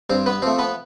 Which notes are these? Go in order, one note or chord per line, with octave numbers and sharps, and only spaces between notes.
G2 C4 C5
B3 B4
F3 A3 C4 C5
B3 B4